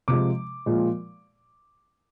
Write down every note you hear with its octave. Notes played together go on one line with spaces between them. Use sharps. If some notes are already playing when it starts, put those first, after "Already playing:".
C3 F3 G#3 D6
A#2 F3 G#3